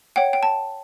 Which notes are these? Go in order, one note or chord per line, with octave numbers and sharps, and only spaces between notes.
C#5 F#5 G5
G5
A5